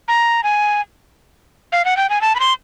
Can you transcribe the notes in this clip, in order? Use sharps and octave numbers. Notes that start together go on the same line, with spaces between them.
A#5
G#5
F5
F#5
G5
G#5
A5
B5
C6